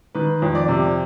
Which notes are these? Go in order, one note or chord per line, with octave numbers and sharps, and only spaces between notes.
D#3 B4
F2
D5
C3